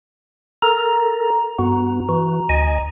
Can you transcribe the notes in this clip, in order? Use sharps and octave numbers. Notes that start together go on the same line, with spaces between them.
A4 A#4 A#5
G2 B3 F#4
E3 F#4
D2 D#5 G#5